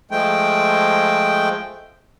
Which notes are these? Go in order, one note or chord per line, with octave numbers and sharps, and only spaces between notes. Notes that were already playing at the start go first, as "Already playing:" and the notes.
F3 G#3 A3 G5